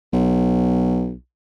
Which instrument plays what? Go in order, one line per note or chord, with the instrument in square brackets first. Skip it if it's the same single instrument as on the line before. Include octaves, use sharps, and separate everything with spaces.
[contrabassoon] B1